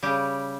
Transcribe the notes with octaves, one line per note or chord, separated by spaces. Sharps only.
C#3 G3 G4